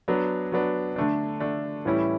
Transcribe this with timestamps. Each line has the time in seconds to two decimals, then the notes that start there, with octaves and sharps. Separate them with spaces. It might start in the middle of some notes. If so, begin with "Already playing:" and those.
0.08 F#3 B3 D4
0.52 F#3 B3 D4
0.96 D3 A3 D4
1.40 D3 A3 D4
1.85 A2 E3 G3 C#4 E4